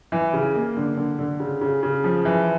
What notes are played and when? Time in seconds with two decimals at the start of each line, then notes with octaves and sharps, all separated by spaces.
0.12 E3
0.33 C#3
0.55 A#3
0.77 D3
0.97 D3
1.19 D3
1.40 C#3
1.61 C#3
1.83 C#3
2.04 F3
2.25 E3